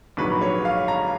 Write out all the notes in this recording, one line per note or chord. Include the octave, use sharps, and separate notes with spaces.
A#1 G#2 F#3 B4
C#5
F5
A#5